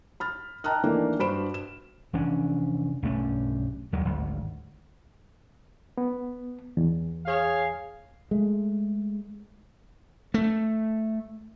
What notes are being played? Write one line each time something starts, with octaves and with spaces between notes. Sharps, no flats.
B5 F6 A6
D#5 G5 A5 A#5 F6 F#6
D#3 E3 A3 A#3 D4
G2 F#4 C5 B5 D7 E7
E7
F1 E3 C#4 D4
B1 G2 A3 C#4
D#2 D#3 F#3 G3
G#1 D2
B3
E2
G#4 C#5 F5
G#3 A3
A3